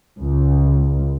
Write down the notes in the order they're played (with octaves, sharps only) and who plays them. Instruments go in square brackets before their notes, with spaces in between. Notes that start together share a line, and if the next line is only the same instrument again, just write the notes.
[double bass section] C#2